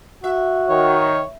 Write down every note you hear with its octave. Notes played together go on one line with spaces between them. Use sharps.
F#4 E5
D#3 C#5